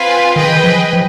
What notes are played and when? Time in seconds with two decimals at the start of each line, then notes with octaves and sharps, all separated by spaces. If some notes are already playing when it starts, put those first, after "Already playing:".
Already playing: C4 F4 B4 F5 G#5
0.35 D#3 G#4 B4 D#5 G5
0.64 F3
0.93 F3